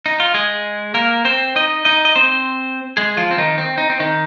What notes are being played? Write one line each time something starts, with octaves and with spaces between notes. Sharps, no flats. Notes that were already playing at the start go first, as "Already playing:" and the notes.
D#4
F4
G#3 G#4
A#3 A#4
C4 C5
D#4 D#5
D#4 D#5
D#5
C4 C5
G#3 G#4
F3 F4
C4
D#3 D#4
C4
D#4
C4
D#3 D#4